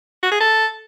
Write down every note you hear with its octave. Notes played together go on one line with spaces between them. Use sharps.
F#4
G#4
A4